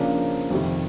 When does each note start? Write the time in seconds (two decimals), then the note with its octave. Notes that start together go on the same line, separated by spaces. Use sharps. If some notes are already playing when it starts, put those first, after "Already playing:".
Already playing: C#3 F3 A#3 D4
0.50 F2 C3 D#3 G3